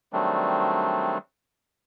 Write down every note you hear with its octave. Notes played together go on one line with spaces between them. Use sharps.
D#3 F#3 G3 A3 C4 D4